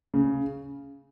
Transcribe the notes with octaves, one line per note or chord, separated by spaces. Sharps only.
C#3